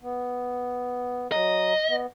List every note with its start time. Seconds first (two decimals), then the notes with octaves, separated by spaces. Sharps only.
0.01 B3
1.32 F#3 D#5 A#5
1.89 B3